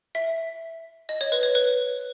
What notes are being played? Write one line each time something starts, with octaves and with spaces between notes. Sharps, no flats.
E5
D#5
C#5
B4
C#5
B4